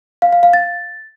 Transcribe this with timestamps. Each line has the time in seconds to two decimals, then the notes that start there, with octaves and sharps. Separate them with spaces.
0.22 F5
0.33 F5
0.43 F5
0.53 A6